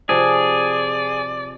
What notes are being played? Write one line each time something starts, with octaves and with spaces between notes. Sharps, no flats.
C3 F3 G#4 D5